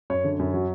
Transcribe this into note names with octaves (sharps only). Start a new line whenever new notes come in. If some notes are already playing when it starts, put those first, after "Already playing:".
F#2 C#5
D3
F#2
F#3